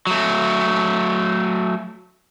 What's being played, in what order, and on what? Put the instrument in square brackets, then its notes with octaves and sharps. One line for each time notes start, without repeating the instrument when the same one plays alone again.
[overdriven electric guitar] F#3 A3